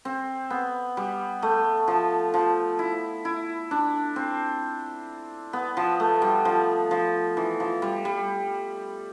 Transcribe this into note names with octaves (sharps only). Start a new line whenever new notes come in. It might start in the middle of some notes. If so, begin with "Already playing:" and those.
C4
B3
G3
A3
F3
F3
E4
E4
D4
C4
B3
F3
A3
G3
F3
F3
E3
F3
G3
G3